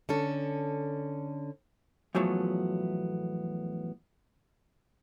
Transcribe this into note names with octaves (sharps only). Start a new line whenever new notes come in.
D3 C#4 A4
E2 A2 F3 F#3 A3 B3